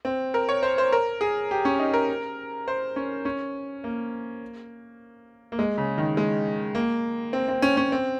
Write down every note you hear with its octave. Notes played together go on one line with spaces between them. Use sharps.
C4
A#4
C#5
C5
C5
A#4
G#4
G4
C#4
D#4
A#4
C5
C#4
C#4
A#3
A#3
G#3
C#3
D#3
G#3
A#3
C4
C4
C#4
C#4
C4